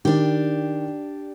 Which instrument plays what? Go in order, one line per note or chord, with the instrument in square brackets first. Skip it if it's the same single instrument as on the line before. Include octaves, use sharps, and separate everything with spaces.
[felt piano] D#3 [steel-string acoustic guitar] D4 G4